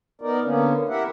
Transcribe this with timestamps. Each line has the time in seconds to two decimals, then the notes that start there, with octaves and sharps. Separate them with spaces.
0.22 B3 D#4 A#4 D5
0.44 D3 A#3 B3 C#4
0.89 E4 G4 A#4 E5 F#5